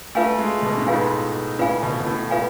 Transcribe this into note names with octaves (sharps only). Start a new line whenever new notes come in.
A3 F4 B4 F5 G#5
G#3
B2
G#2
A2 F4 B4 F5 G#5
A2 F4 B4 F5 G#5
B2
B2
A2
F4 B4 F5 G#5